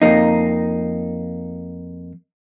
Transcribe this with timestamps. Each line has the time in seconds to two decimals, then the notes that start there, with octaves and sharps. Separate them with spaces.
0.02 F2 A#3 D#4